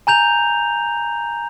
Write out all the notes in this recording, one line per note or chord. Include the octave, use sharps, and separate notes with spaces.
G#5 A#5 G6 F7